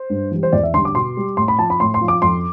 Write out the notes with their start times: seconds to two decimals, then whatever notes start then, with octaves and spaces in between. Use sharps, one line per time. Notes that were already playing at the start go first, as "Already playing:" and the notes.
Already playing: C5
0.10 G2
0.31 E3 G3
0.43 C5
0.53 E2 D5
0.63 E5
0.74 D3 G3 C6
0.85 D6
0.95 B2 C6
1.17 G3
1.37 A2 C6
1.48 B5
1.59 F3 A5
1.70 B5
1.80 A2 C6
1.94 C6
2.01 F3
2.08 D6
2.22 F2 C6